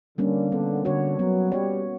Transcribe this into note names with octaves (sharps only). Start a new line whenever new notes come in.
D3 G3 A#3 C#4
D3 B3
D3 F#4 C#5
F#3 B3
G3 F#4 C#5